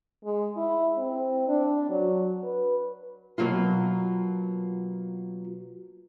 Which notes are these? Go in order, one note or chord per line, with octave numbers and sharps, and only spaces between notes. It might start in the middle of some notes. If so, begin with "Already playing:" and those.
G#3
E4
C4
D4
F#3
B4
B2 F3 F#3 A#3 F4